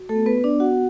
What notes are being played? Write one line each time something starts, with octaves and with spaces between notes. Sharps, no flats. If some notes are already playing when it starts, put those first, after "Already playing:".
Already playing: F#4
A3 A4
B3
B3 B4
B3
D4 D5
F#4 F#5